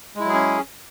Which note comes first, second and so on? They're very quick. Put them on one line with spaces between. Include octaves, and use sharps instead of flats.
G#3 E4 F#3 G#4 C#4